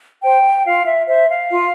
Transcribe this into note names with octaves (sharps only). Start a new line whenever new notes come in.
C5 G5
F4 F5
E5
C5 E5
F5
F4